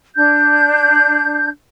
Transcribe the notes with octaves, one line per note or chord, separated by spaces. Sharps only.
D4 G6